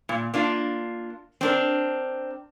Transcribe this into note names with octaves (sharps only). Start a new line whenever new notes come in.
A#2
A#3 D4 F4
C4 D4 A#4